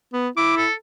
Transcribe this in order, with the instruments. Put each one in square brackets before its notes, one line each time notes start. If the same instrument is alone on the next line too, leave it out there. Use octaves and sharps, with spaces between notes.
[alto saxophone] B3
[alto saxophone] E4 [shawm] D6
[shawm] A4